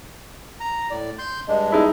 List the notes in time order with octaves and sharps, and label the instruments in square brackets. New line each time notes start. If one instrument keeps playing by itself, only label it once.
[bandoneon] A#5
A2 D5
C6 G6
[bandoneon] G2 G#3 D4 [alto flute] D#5
[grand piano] D#4 E4 [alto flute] G#4